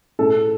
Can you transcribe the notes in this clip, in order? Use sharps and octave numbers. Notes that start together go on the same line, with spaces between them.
A2 A4